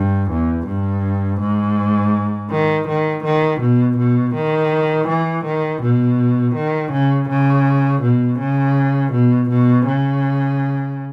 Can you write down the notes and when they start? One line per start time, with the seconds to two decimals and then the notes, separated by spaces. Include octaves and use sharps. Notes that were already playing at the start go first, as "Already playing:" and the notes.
Already playing: G2
0.31 E2
0.67 G2
1.40 G#2
2.51 D#3
2.88 D#3
3.24 D#3
3.61 B2
3.97 B2
4.35 D#3
5.08 E3
5.45 D#3
5.82 B2
6.55 D#3
6.92 C#3
7.29 C#3
8.02 B2
8.39 C#3
9.12 B2
9.50 B2
9.86 C#3